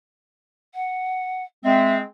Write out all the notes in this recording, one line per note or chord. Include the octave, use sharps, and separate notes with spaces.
F#5
G#3 C4 E5